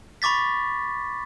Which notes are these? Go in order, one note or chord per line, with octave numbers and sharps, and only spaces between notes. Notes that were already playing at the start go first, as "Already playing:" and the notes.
B5 C#6 D6 A6 B6